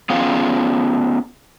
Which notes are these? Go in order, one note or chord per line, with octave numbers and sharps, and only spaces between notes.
B3 C#4 F4 G#4 F5 G5